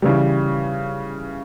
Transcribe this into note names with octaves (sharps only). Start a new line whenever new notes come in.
C#3 E3 G3